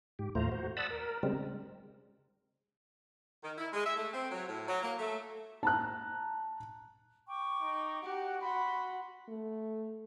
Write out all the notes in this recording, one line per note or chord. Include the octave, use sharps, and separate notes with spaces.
G#2 G4
D#2 A2 A3 F4 C5 A#5
F#4 C5
D5 F#5 A5 B5 D#6 E6
A#4
C#3 G3 G#3 C4
D#3
E4
G#3
E5
A3
C4
F#3
A2
F#3
A#3
A3
A5 A#5 F#6
G5 C#6 D6
D#4
F#4 G4 F#5
F#4 B5 C6
A3